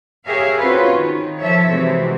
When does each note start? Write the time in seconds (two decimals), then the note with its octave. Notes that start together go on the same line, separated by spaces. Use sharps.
0.25 G4 G#4 A#4 C#5 E5 F5
0.58 C4 C#4 F4 F#4 B4 C#5
0.93 D#3
1.39 F3 A4 C#5 E5
1.70 C3 E3 G#3 F#4